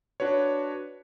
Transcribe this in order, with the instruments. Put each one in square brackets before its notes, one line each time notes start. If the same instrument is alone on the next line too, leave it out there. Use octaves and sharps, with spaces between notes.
[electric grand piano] D4 F#4 B4 C#5